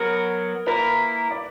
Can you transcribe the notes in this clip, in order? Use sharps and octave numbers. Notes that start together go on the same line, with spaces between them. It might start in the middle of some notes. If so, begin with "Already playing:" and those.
Already playing: F#3 B3 F#4 A#4
A#3 E4 A#4 B4
D5